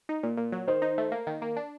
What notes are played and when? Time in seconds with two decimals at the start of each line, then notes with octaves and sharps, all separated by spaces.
0.09 D#4
0.23 A#2
0.37 A#2
0.52 F#3
0.67 D#3 C5
0.82 D#4
0.98 A3
1.12 A#3
1.27 D#3
1.42 A#3
1.56 D4